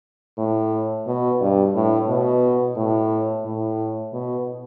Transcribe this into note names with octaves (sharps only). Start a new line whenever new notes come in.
A2
B2
G2
A2
B2
A2
A2
B2